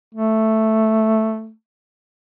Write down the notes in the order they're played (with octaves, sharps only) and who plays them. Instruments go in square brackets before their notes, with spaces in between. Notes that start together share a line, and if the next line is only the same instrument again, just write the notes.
[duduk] A3